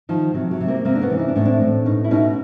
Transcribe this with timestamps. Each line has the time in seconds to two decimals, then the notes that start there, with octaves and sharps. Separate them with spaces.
0.09 D#3 F3
0.34 C3 F#3
0.51 F#3
0.61 C3
0.68 A#3 C4
0.85 C3 A#3 C4
0.95 D4
1.01 B3 C#4
1.10 E3
1.19 D#4
1.28 D4
1.36 A2 C#4
1.45 C4 D4
1.61 A2
1.86 B2 C#4 D#4
2.04 E4
2.11 B2 C#4 D#4